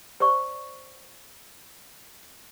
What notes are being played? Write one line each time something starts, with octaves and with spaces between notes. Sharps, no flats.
C5 D5 C#6